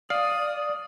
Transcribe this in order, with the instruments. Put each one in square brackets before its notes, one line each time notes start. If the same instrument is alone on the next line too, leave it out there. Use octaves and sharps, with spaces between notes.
[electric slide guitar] D5 [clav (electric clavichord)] F5 [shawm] D#6